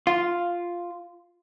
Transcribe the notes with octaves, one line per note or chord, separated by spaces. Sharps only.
F4